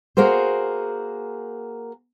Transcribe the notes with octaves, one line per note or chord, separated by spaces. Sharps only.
A#3 F#4 G#4 A#4 C5